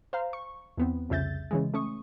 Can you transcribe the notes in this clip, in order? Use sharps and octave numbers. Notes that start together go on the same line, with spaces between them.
C5 F5 A#5
C#6
E2 B3 C4
C2 F2 C#3 E5 G6 A6
C#3 E3 G#3
A3 C#4 C#6 D#6